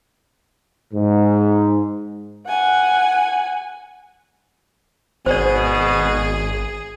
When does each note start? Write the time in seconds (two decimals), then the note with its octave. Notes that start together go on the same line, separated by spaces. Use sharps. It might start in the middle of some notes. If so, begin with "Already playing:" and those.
0.94 G#2
2.47 F#5 G#5
5.26 G#1 B2 G#4 C5 D5